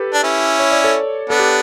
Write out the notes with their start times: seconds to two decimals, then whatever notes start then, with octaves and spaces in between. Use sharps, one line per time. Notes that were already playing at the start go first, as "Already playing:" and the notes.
Already playing: G4 A4 B4
0.14 D4
0.23 C#4 E4
0.59 C#5
0.71 D5
0.84 A4 C#5
1.30 B3 D4 A4
1.39 G4